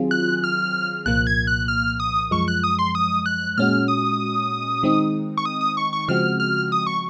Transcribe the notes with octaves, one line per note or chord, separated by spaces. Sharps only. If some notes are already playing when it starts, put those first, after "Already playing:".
Already playing: D#3 F#3 C4 F4 G#4
F#6
F6
C2 A#2 F3 A#3 F#6
G#6
F#6
F6
D#6
F#2 F3 G#3 C#6
F#6
D#6
C6
D#6
F#6
A#2 G#3 C#4 F#4 F6
D#6
D#3 G#3 C4 D#4
C#6
D#6
D#6
C#6
C#6
C#3 F3 G#3 C4 F#4 F6
F6
D#6
C#6